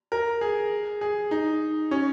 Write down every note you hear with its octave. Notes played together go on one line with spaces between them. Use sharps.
A#4
G#4
G#4
D#4
C#4